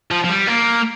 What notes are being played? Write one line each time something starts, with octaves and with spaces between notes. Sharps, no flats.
F3
F3
G3
A#3